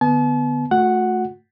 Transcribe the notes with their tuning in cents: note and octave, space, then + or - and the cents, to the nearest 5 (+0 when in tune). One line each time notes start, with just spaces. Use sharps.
D3 +10 B3 +0 A5 -40
A3 +0 F#4 -40 F#5 +0